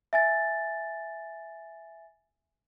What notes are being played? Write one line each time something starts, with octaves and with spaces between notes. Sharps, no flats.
E5 G#5 A6